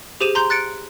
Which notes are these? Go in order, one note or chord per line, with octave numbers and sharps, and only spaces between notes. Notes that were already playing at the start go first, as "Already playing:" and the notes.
G4 G#4 C5 D#7 E7
A#5 C6 G6
F#6 A6 C#7 D7